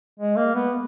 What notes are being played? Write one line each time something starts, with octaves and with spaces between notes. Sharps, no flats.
G#3
A#3
B3